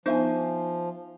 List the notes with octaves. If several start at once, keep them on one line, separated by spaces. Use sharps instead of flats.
F3 B3 D4 D#4 C5 E5 G#5